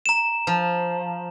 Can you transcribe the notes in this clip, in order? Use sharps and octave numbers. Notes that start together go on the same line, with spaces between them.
A#5 E7
F3